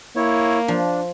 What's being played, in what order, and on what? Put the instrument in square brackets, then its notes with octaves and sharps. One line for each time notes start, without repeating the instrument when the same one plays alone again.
[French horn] A#3 [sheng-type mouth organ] E4 C#5
[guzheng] F3 [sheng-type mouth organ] D4